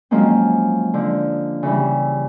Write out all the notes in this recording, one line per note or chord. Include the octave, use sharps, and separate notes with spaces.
F3 F#3 G#3 A#3 C4 C#4
D3 F3
C#3 E3 G3